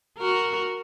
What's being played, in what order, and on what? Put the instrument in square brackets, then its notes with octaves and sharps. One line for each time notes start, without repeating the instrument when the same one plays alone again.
[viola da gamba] F#4 A#4